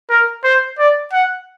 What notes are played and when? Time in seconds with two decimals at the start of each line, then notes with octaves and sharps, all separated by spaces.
0.10 A#4
0.44 C5
0.79 D5
1.12 F#5